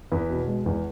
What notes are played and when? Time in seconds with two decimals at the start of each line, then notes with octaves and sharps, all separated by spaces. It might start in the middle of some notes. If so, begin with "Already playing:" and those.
0.12 E2 B4
0.30 B2
0.48 G#3
0.66 E2